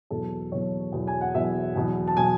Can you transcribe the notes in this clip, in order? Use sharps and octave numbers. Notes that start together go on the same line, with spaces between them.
E2 B2 F#3 A4
E2 B2 F#3 C#5
E2 B2 F#3
G#5
F#5
E2 B2 F#3 E5
E2 B2 F#3
A5
B2 F#3 G#5